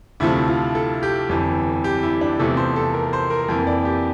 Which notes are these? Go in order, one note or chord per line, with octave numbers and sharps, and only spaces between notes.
D2 C3 F3 A3 E4
F4
A4
G4
G1 F2 E3
G4
E4
D4
E2 C3 F3 A3 A4
C5
A4
A#4
C5
A#4
F2 E3 A#3 A#4
D5
G4